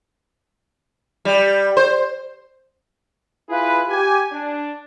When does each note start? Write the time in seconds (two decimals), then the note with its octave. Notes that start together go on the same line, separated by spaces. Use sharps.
1.25 G3
1.77 C5
3.49 E4 F4 G#4 B4
3.88 G4 G#5
4.32 D4